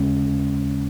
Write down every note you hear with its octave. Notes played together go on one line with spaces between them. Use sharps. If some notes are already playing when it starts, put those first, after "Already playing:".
Already playing: D#2 C#3 G#3 C#4